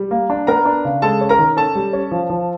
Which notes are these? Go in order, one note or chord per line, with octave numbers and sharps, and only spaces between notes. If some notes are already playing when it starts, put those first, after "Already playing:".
Already playing: G3
A#3
D4
B3 A#4 A#5
D4
C#3
G#3 A4 A5
C#4
A#4 A#5
D#3
C#4 A4 A5
G3
C#4
F3
F3